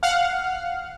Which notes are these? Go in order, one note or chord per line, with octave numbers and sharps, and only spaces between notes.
F5 F#5 F6